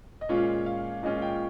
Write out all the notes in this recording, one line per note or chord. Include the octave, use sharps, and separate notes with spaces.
D#5
A#2 G#3 C#4 F4 C#5
F5
A#2 G#3 C#4 F4 D#5
G5